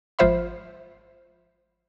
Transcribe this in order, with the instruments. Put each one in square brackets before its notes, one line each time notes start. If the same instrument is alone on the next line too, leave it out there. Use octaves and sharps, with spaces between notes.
[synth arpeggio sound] G#1 F3 F4 C5 E5 B5